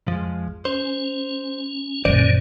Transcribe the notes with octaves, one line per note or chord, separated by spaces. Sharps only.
F2 F3 G#3
C#4 C5
F#2 A#2 D3 D#3 C#4 C5 D5